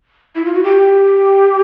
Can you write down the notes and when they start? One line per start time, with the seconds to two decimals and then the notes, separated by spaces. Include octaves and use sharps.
0.35 E4
0.45 F4
0.54 F#4
0.63 G4